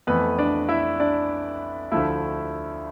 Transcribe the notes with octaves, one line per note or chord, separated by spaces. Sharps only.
F2 E3 A3 B3 B4
D4 D5
E4 E5
D4 D5
D2 D3 F3 A3 E4 E5